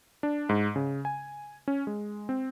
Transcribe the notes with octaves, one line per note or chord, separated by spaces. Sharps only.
D4
G#2
C#3
G#5
C#4
G#3
C4